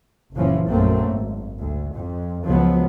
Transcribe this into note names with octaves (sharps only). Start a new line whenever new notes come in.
F#1 A#2 E3 F3 C#4
A#1 F#2 A3 A#3 C4
G#1
D2
F2
C#2 F3 F#3 B3